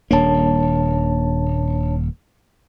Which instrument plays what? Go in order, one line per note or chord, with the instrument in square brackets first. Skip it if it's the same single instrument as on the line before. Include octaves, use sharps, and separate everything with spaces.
[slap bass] D#1 A#3 [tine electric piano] D4 C#5 A5